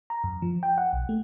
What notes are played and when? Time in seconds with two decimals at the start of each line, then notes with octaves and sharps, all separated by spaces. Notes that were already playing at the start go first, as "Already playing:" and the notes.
0.10 A#5
0.24 F#2
0.42 F3
0.63 G5
0.78 F#5
0.93 B1
1.09 A3